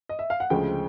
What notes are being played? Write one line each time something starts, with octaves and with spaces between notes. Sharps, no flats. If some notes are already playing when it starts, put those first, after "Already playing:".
D#5
E5
F5
F#5
D2 C#3 F3 G#3 G5